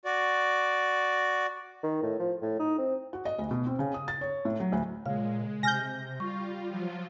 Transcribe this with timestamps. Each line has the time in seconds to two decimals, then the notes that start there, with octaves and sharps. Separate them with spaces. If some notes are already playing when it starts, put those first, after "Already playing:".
0.05 F#4 D5
1.83 D#3
2.03 A2
2.19 F3
2.42 A2
2.59 D#4
2.78 C4
3.13 F#4
3.25 D#5
3.39 D2
3.51 B2
3.66 C4
3.79 C#3
3.94 D#6
4.08 A6
4.21 C#5
4.45 A2
4.60 F#3
4.72 D2
5.06 A#2 C#3 G#3 F5
5.63 C3 G#5 F6 G6 A#6
6.20 G3 F4 C#6
6.69 F3 F#3 F4